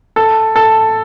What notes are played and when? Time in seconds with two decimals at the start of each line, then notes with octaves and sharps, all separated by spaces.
0.16 A4
0.56 A4